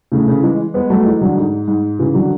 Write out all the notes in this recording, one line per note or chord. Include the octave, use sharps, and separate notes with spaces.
A2 C#3
C#3 E3
E3 G#3
G#3 B3
F#3 A3
E3 G#3
D3 F#3
G#2
G#2
C#3 E3
D3 F#3